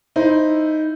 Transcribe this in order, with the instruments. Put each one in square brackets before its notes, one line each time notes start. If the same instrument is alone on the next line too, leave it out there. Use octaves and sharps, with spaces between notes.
[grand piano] D#4 E4 C5